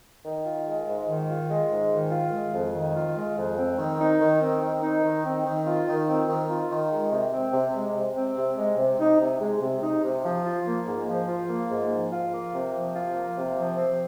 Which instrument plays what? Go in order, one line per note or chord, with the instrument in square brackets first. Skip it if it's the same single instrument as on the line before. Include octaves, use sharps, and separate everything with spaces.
[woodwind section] D#3
F4
G#3
G#2
D#3
F4
G#3
G#2
D#3
F4
G#3
F2
D#3
F4
G#3
F2
C4
D#3
D#4
D#3
C4
D#3
D#4
D#3
C4
D#3
F4
D#3
C4
D#3
F4
D#3
G#3
C3
C4
C3
G#3
C3
C4
C3
G#3
C3
D#4
C3
G#3
C3
D#4
C3
F3
F4
A#3
G#2
F3
F4
A#3
G#2
F3
F4
A#3
C3
F3
F4
A#3
C3
F3
C4